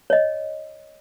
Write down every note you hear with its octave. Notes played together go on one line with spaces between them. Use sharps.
C#5 D#5